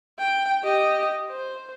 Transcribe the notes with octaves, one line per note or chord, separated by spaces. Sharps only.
G5
G4 D#5
C5